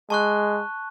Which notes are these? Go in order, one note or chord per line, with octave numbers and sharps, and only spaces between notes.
G#3 A5 C#6 F#6